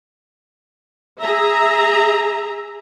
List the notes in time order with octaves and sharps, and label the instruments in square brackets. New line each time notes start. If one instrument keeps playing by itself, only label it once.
[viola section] G#4 E5 A#5